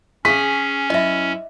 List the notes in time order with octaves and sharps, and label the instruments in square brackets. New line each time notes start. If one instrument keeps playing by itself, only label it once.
[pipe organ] C#4 [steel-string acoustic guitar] G#4 [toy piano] C#6 [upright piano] B6
[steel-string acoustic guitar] F#2 E4 [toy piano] D#5 E5